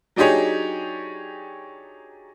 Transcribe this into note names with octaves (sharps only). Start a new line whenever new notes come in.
F#3 D4 D#4 G4 G#4 C#5